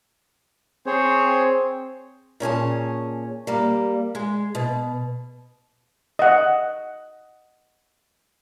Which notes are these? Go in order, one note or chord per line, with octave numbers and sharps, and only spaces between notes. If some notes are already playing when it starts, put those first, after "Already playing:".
C4 G#4 C5 C#5
A#2 C#4 G#4 A5
G3 A#3
G#3
B2
D#5 F#5